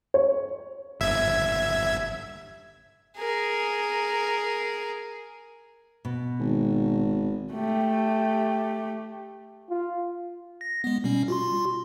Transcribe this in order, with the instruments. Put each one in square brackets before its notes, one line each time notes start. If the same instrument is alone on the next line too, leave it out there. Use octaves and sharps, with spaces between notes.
[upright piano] C#5
[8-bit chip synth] G1 E5 G#6
[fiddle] G#4 A#4
[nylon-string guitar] B2
[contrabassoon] G#1
[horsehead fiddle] A3 G4
[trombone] F4
[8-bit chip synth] A#6
G#3 B3
B2 G3 C#4
F4 F#4 C6